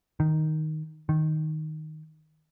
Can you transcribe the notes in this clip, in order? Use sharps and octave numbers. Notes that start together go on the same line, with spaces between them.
D#3
D#3